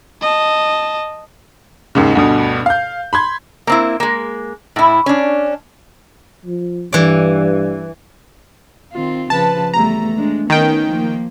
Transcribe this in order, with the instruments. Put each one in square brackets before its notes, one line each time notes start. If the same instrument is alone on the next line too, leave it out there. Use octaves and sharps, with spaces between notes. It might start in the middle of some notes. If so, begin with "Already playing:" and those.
[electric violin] D#5 A5
[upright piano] D#2 G#2 C#3
D2 G2 B2
F5 G6
B5 C6 G#6
[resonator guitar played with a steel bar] A#3 C4 E4
G#3 A#3
A2 E4
C#4 D4
[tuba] F3
[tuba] G2 [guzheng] E3 D5
[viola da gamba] D#3 C4 F4
[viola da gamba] C#3 F3 B4 [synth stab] A5
[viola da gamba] E2 G3 A3 [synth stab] A#5
[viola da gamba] G#3 D4
[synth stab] D#3 G5 [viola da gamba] B3 C#4
[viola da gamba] F3 A#3